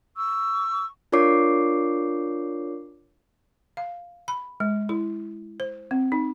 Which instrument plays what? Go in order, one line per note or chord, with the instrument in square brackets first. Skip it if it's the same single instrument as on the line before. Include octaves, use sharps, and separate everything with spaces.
[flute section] C#6 E6
[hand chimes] D4 F4 A#4 C#5 D6 C7
[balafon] F5
B5
G#3
E4
C5
C4
D#4